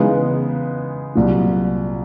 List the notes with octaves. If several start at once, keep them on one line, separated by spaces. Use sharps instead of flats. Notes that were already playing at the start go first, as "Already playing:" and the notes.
Already playing: C#3 E3 G#3 B3 D#4
C2 A#2 F#3